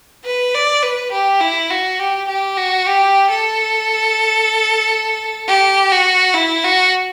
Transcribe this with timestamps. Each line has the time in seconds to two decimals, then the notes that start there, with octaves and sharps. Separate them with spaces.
0.25 B4
0.54 D5
0.83 B4
1.12 G4
1.41 E4
1.70 F#4
1.99 G4
2.28 G4
2.57 F#4
2.86 G4
3.30 A4
5.48 G4
5.92 F#4
6.34 E4
6.64 F#4